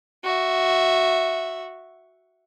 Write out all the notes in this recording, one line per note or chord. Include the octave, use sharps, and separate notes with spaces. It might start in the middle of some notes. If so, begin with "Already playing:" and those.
F#4 E5